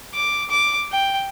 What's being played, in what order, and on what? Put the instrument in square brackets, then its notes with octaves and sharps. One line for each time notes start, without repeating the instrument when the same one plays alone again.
[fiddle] D6
D6
G5